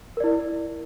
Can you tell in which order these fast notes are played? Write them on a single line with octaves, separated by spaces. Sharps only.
A#4 D5 E4